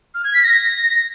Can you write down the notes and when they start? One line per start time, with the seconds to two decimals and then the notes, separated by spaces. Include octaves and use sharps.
0.15 F6
0.24 G#6
0.34 B6
0.43 A#6